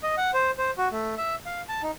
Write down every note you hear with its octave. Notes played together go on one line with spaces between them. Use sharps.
D#5
F#5
C5
C5
F#4
A3
E5
F5
A5
D#4